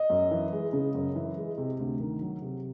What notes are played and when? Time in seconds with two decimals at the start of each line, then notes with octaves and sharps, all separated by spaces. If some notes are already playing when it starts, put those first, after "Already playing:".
Already playing: D#5
0.10 F#2
0.31 E3
0.53 G#3
0.73 C#3
0.95 F#2
1.16 E3
1.37 G#3
1.58 C3
1.79 D2
2.00 D#3
2.21 F#3
2.42 C3